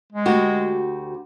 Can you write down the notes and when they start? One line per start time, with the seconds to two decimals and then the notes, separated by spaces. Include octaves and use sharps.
0.13 G#3
0.26 D2 F#4 G4